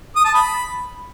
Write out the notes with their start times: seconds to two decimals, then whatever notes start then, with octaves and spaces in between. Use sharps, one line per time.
0.16 D#6
0.25 A5
0.34 B5